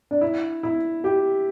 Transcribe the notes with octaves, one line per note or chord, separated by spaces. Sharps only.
D4
E4
E4
G4